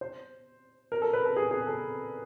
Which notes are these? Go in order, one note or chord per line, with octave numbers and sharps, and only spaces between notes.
C5
A#4
A4
B4
A4
G#4
G#4
A4